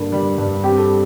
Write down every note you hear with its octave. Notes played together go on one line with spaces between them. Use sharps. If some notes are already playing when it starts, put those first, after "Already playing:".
Already playing: G2 D3 G3 A#3
G3
G2
C4 G4
A4